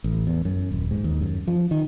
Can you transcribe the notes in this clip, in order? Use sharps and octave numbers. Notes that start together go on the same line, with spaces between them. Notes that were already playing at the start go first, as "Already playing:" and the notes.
A1
E2
F#2
D#1
G#2
D#2
F#2
F3
D#3